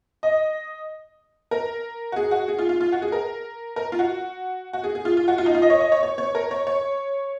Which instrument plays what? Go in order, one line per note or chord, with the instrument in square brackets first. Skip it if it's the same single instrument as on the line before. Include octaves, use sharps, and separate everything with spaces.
[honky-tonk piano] D#5
A#4
F#4
G#4
F#4
G#4
F4
F4
F4
F#4
G#4
A#4
A#4
F4
F#4
F#4
G#4
G#4
F4
F4
F#4
F4
D#4
F4
D#5
C#5
D#5
C#5
C#5
C#5
A#4
C#5
C#5